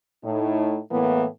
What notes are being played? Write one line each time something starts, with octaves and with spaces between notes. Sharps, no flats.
A2 D#4
A2 E3 A#3 B3